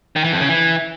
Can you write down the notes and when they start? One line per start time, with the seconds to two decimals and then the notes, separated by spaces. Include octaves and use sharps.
0.16 D#3
0.24 E3
0.32 F2
0.41 C#3
0.49 E3